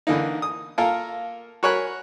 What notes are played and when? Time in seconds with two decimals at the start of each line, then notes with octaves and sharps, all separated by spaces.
0.07 D3 E3 A#3 D#4
0.42 D#6
0.78 A#3 F4 A4 A#4
1.63 F#4 A#4 C#5 G#5 B5 F#6